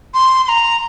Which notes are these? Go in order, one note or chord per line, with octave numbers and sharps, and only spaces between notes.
C6
C6
A#5